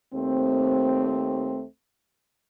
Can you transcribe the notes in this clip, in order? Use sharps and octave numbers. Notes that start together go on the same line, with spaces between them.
D#2 A3 C4